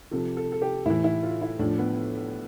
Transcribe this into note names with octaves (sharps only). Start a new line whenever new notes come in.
C3 F3 A4
A4
A4
G4
A2 E3 E4
E4
F4
E4
A2 F3 D4
B3